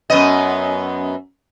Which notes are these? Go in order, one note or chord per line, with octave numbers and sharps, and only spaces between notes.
F#2 B3 D#5